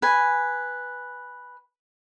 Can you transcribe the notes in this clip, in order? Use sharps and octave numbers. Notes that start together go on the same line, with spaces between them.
B4 G#5